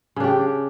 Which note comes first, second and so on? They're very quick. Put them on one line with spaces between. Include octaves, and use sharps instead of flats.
C#3 D4 G4